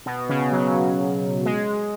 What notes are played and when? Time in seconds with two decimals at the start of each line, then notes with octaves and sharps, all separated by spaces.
0.06 B2
0.29 C#3
0.52 F#3
1.45 G#3